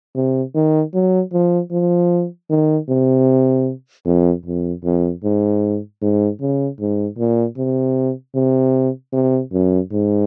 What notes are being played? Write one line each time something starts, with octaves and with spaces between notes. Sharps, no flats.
C3
D#3
F#3
F3
F3
D#3
C3
F2
F2
F2
G#2
G#2
C#3
G#2
A#2
C3
C3
C3
F#2
G#2